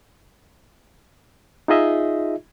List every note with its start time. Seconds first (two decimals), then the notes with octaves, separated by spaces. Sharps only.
1.68 D#4 F4 G#4 D#5 E5